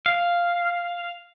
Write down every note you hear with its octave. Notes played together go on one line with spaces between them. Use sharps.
F5